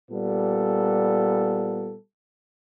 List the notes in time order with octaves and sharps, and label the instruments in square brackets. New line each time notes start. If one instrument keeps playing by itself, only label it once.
[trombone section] A#2 G3 B3 A4